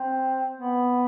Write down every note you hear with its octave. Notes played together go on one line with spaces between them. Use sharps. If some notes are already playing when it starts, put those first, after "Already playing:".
Already playing: C4
B3